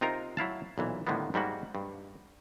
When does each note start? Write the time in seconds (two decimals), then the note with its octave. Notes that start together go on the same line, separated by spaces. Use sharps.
0.01 C3 C4 D#4 F4 A#4 A#5
0.37 F#3 E4 F5 A5
0.78 B1 A#2 E3
1.07 A2 D3 D#3 G3 A#3 B3
1.34 G#2 G3 A#3 F#4
1.75 G2